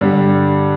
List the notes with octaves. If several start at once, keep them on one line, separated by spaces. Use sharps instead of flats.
G2 D3 G3